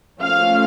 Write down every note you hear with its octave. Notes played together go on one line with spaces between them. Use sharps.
F3 A3 C#4 F5